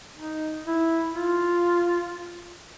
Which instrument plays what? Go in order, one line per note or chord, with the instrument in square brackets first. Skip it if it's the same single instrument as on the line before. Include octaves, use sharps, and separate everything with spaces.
[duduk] D#4
E4
F4